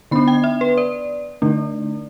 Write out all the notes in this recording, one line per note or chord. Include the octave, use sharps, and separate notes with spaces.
D3 B3 D4 B5
G5
E5
B4
D5
D3 A3 D4